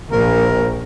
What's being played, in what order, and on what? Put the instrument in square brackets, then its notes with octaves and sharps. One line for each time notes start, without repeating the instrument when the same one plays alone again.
[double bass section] A#1 [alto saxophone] A#4